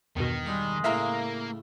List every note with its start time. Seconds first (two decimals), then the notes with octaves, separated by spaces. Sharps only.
0.16 E2 G2 B2 D#3
0.46 G3 G#3
0.84 A2 C#3 A#3 E5 F5 A#5